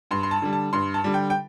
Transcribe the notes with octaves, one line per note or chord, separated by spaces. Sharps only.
G2 C6
C6
A5
D3 G3
A5
G2 C6
A5
D3 G3
G5
G5